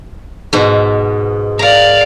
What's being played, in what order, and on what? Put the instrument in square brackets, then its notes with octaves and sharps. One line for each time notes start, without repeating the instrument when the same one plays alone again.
[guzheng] G#2 B2
[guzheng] A#4 A#5 [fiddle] D5 F5